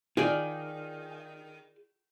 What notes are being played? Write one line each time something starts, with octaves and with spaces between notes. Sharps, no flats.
D#3 F4 G#4 D5